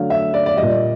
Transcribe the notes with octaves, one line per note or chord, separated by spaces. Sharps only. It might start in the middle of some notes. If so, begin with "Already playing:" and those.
Already playing: D3 F#3 A3 F5
E5
D5
D5
A#2 G3 D#5